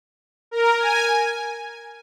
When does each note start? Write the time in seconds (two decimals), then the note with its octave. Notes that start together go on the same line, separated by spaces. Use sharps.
0.51 A#4
0.79 G#5